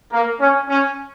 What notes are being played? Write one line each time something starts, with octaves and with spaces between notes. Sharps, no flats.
A#3
C#4
C#4